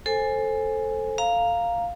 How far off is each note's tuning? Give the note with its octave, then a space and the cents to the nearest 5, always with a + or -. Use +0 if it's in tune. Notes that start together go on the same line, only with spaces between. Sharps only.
A4 +0 C5 +15 G#5 +0
F5 +0 A#5 +0